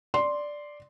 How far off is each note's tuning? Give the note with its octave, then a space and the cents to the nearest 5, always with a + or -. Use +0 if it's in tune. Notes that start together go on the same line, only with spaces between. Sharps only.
D5 +0 C6 +0